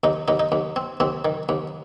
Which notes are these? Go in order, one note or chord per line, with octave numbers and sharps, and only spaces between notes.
D#2 D#4
D#2 D#4
D#4
D#2
C4
D#2 C4
D#3
D#2